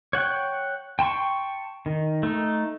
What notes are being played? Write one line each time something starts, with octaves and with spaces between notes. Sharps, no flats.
C#5 F#5 G5 F#6
G5 A5 C6 C#6
D#3
A3 D#4